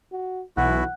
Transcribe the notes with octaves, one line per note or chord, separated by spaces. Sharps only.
F#4
B1 E3 E4 F#4 F#5 F#6